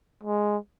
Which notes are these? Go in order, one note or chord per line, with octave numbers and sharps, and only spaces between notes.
G#3